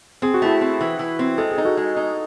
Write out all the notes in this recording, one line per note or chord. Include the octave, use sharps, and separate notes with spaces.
C4 G#4
F#4
A3 E4 G#4
C4
E3
E3
C4
G#3 A4
G#4
D#4
F#4 A4
G#3
D#4